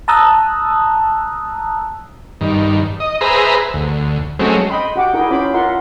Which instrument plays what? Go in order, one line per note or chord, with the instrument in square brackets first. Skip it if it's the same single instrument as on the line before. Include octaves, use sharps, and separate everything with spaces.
[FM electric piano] A5 A#5 D#6 E6 F#6
[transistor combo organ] G2 D#3
D#5
G#4 B4 C5 E5 A#5
D2
F#3 G#3 A3 C4 C#4
[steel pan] D#5 G5 B5 C6
F#4 G4 F#5 G5 D6
D4 E4 G#4 A#4 G5
C#4 F4 C5 B5 D6
F4 A#4 E5 F#5 C6